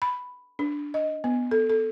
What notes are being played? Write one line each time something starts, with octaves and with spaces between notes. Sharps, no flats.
B5
D4
D#5
B3
A4
A4